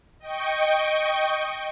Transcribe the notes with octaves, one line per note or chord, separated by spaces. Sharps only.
D#5 G5 C#6